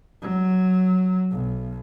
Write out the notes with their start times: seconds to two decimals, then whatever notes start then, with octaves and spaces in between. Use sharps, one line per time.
0.22 F#3
1.32 B1